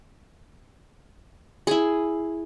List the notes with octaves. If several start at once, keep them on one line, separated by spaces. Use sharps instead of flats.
E4 G#4